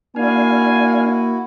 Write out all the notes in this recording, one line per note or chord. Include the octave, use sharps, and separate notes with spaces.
A#3 D4 E4 F#4 F5 G#5